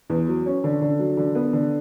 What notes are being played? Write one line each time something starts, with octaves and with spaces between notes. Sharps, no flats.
E2
F#3
C#4
D3
D3
F#3
D3
B3
D3